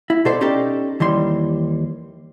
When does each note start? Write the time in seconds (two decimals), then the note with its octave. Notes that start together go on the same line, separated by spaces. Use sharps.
0.10 E4
0.25 B2 A4 C5 D5
0.41 C#4 D#4 G4 A4 D5
1.00 D#2 E3 G3 C6